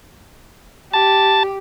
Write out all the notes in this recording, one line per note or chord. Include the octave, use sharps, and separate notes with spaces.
G4 A5